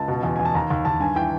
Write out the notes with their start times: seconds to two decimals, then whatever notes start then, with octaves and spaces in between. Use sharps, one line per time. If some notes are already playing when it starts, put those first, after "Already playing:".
Already playing: C#2 A5
0.08 B2
0.23 E2
0.36 E2 G#5
0.45 A5
0.55 D#2 A#5
0.70 D#2
0.85 D#2 A5
1.00 G2 G#5
1.16 E3 G5